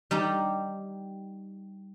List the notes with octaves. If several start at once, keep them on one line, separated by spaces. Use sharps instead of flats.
G3 D#4 G4